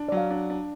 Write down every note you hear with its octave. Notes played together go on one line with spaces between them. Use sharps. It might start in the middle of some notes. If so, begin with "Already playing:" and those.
Already playing: D4
F#3 D5
F5
D4
D4